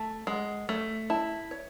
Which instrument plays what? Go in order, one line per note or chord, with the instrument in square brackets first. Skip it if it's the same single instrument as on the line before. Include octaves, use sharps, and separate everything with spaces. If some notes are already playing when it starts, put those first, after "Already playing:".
Already playing: [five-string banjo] A3 [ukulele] A5
[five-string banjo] G#3 [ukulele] F#5
[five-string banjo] A3 [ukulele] C#5
[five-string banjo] E4 [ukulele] A5
[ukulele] C#5